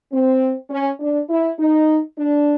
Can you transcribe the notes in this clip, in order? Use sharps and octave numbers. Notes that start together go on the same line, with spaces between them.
C4
C#4
D4
E4
D#4
D4